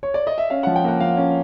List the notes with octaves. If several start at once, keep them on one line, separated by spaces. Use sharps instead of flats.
C#5
D5
D#5
E5
C#4 F5
F3 F#5
G5
A#3 F#5
F3 F5
C#4